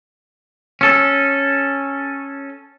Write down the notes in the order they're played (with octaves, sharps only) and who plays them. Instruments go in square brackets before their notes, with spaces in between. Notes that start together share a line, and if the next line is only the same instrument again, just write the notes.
[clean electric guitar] C#4 A4